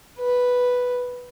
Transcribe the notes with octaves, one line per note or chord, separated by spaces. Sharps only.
B4